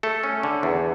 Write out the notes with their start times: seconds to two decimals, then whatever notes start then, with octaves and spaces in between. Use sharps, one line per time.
0.03 A3 A4
0.24 C#4
0.43 D3
0.63 E2